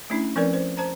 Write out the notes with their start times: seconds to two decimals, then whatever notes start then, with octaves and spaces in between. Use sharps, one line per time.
0.10 A3 C#4 D4 E4
0.36 F3 C4 C#4 A#4 B4 D5
0.54 C5
0.77 C5 A5 A#5